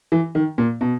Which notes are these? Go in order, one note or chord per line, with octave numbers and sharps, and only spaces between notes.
E3
D#3
A#2
B2